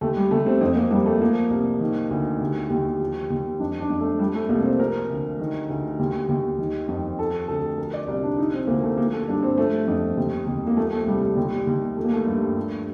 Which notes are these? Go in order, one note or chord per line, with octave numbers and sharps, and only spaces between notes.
D#2 A3
G3
D#2 A3
C4
F2 C4
A#3
F2 G3
A3
F3 A#3
C2
D#3
D2
D#2
D#2
F3
D#2
F2 D4
D4
F2
A3
F3 G3
A3
C2 A#3
C4
F3 A#4
D2
D#3
D2
D#2
D#2
D#3
F2
F3 A4
D2 A4
F3 A#4
D5
C2
D4
F3 D#4
C4
D2 A#3
A3
F3 A#3
A4
G2 D4
C4
F3 A3
F2
D#2
D#2
A#3
F3 A3
A3
C2 G3
G3
D#2
D#2
F3 A3
A#3
A3
G2
F3